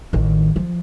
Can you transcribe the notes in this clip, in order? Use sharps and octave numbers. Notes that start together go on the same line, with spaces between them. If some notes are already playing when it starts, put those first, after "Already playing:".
A1 D#3
F3